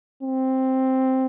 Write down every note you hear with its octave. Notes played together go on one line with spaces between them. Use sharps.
C4